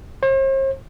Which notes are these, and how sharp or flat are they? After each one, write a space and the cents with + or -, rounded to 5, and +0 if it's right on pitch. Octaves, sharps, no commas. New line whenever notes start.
C5 +45